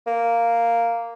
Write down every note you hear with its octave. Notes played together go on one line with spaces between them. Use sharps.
A#3